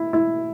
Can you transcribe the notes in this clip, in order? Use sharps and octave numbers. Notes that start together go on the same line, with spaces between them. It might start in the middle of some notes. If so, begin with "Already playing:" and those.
Already playing: E4
E4